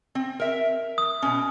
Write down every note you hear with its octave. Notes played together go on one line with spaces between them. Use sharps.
C4
A#4 E5
D#6
B2 C#4